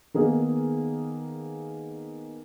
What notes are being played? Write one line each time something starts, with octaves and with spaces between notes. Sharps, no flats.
D#3 A#3 B3 D#4 G#4